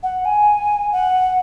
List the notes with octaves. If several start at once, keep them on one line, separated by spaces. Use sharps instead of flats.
F#5
G#5
F#5